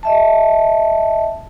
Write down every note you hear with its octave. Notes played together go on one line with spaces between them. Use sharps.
D#5 E5 A5